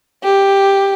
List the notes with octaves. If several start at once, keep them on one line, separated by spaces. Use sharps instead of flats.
G4